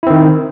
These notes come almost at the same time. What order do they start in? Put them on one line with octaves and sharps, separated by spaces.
E4 C4 D#3